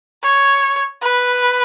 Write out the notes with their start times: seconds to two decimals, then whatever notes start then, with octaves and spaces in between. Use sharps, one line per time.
0.23 C#5
1.02 B4